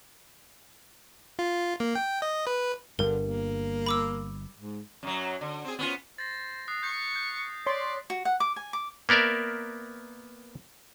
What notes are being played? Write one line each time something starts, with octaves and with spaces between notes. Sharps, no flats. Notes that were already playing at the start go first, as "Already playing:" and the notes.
F4
A#3
G5
D#5
B4
G1 G2 D3 A#4
A#3
B5 D6 E6
G#2
F#2 F#3
D3
C4 G#4
B3 C#4 F4
C5 A6 A#6
D#6 F#6 C7
C#6 G6
G6
C#5 D5 C6 B6
F#4
F#5
D6
G#5
D6
A#3 B3 A#4 D5 E5